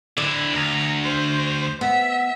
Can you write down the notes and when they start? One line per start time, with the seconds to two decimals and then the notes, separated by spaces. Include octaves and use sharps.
0.17 D3 D4 E4 D5
0.53 D2 A#5
1.03 C5
1.81 B3 E5